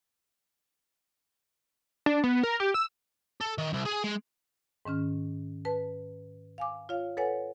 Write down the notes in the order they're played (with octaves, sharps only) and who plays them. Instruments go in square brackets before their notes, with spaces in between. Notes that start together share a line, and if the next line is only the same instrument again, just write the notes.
[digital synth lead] D4
B3
A#4
G4
E6
[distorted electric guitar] A4
D#3
C2
G#4 G#5
G#3
[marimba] G#2 D#3 C#4 F6
B4 A5
F5 G#5 D6
F4 C#5 F5
A4 B4 C#5 F#5 G#5